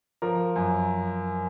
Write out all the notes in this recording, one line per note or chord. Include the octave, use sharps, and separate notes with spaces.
F3 A#4
F#2